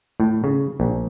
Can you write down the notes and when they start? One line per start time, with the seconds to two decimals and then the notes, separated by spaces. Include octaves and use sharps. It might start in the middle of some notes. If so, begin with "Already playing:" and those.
0.20 A2
0.44 C#3
0.80 A#1